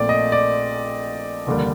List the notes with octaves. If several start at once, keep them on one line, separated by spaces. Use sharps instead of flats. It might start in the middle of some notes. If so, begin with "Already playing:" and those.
Already playing: A#1 A#2 A3 C4 D5
D#5
D5
F1 D#2 D3 G3 A#3